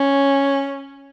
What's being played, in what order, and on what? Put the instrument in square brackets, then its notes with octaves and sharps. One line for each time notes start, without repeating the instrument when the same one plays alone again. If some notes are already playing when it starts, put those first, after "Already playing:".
Already playing: [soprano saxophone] C#4